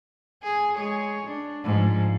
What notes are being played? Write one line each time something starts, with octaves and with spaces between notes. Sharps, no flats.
G#4
G#3 G#4 C#5
D4
G#2 F3